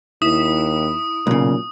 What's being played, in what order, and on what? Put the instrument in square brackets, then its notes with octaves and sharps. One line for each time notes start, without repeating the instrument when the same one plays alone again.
[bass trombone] D#2 [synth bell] E4 [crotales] D#6
[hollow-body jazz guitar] B1 C#3 [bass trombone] A#2